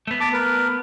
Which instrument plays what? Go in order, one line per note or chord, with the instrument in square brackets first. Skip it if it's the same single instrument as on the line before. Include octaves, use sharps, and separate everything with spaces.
[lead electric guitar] A3 B3
[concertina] A5 D6
A#4 B4